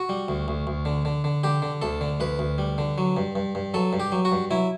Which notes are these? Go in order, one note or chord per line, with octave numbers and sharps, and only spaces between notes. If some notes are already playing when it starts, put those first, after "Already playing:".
Already playing: F#4
G3
D2
D2
D2
D3
D3
D3
D3 G4
D3
D2 A4
D3
D2 B4
D2
G3
D3
F#3
G2
G2
G2
F#3 A4
G2
G4
F#3
F#4
G2
F#3 E4